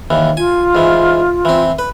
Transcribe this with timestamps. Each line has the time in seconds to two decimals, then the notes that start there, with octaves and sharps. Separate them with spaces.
0.10 D#2 E3
0.37 F4 G#5
0.75 G#2 E3
1.45 E3 C4
1.79 B4